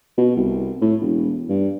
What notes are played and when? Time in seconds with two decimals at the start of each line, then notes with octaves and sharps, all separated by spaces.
0.18 B2
0.36 C2
0.81 A2
1.01 E1
1.49 G2